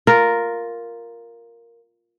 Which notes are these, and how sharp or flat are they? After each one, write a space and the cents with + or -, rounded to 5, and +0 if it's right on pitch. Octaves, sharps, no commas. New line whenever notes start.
F4 +0 A#4 +0